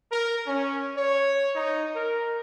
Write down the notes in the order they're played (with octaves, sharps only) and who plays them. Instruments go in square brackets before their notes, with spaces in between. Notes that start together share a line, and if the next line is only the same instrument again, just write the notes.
[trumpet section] A#4
C#4
C#5
D#4
A#4